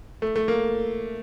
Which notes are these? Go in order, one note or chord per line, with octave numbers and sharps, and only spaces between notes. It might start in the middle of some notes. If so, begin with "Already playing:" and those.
A3
A3
A#3